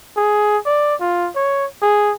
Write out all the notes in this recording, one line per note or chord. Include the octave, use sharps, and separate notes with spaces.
G#4
D5
F4
C#5
G#4